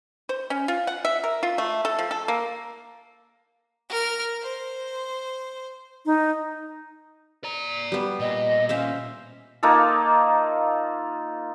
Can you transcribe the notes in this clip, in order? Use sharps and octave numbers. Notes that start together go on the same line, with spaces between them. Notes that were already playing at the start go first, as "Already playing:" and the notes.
C5
C#4
F4
F#5
E5
A#4
F4
A3
A4
F3
A4
A#3
A#4 F6
C5
D#4
D5 A#5
G3 B3
A#2 D#5
C#4 C5 E5 F5
A#3 D#4 F4 A4